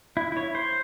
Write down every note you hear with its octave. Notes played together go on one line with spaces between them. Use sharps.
E4
E4 C#5
C5